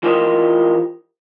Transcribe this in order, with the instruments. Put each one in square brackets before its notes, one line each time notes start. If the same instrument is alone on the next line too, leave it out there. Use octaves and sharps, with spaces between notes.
[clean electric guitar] E3 F4 G4 A#4 C5 D#5